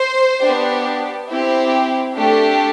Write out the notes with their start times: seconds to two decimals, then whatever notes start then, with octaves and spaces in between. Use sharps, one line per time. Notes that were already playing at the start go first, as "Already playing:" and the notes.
Already playing: C5
0.41 B3 D4 G4
1.28 C4 E4 G4
2.15 A3 D4 G4